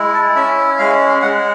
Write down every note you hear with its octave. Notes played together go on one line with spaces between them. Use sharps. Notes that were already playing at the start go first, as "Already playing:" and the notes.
Already playing: G#3 E4
A5
C#4 E5
G#3 F5
G#3 F#5